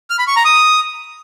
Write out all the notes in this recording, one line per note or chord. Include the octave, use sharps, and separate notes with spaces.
F6
B5
C#6
A#5
D#6